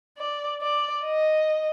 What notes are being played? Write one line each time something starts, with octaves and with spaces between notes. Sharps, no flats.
D5
D5
D#5